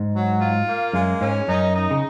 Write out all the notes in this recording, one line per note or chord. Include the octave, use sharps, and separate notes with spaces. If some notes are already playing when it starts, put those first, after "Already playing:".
Already playing: G#2
F#3
F4
A#3
F#2 G#3
G#2 C#4
F#2 D#4
D#4
C#3